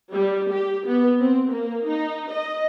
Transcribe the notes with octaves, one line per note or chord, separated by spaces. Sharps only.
G3
G4
B3
C4
A#3
D#4
D#5